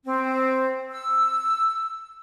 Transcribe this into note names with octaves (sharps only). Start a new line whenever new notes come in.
C4
E6